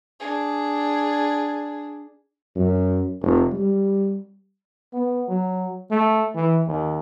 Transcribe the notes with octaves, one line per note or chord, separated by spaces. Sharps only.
D4 G#4
F#2
F1
G3
B3
F#3
A3
E3
D#2